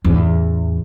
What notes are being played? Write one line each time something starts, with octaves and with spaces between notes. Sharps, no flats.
A1 E2